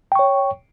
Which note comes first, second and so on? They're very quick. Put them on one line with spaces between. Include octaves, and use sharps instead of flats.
G5 C#6 C#5